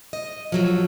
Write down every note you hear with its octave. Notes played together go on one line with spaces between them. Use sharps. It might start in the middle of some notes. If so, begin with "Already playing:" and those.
D#5
F3 F#3 A3